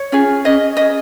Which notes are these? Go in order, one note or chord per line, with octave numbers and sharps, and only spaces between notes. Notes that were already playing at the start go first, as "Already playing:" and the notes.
Already playing: C#5
C#4 F4 G#4
C#4 G#4 D#5
C#4 G#4 D#5